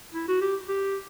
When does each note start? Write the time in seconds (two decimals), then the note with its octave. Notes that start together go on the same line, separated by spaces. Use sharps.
0.14 E4
0.28 F#4
0.41 G4
0.68 G4